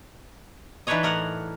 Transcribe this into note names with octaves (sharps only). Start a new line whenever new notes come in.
E3 D4 D#4 B4 C#5 D#5
A2 A#4 F#5